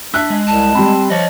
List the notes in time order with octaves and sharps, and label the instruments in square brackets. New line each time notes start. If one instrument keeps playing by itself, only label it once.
[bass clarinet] D4 [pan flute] E5 [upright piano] E6 F#6
[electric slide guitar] G#3
[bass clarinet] C2 [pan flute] A5
[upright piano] G3 B5 [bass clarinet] C4
[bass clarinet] F3 [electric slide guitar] C#5 D#5